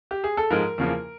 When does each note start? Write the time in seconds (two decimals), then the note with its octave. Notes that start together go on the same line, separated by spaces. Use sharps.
0.11 G4
0.24 G#4
0.37 A4
0.50 G#2 F3 G#3 A#4
0.78 E2 C#3 F3 A#3